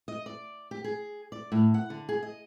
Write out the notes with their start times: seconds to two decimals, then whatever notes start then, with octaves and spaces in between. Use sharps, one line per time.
0.08 D#5
0.26 D5
0.71 G4
0.84 G#4
1.32 D5
1.52 A2
1.74 F#5
1.90 D3
2.09 G#4
2.23 D#5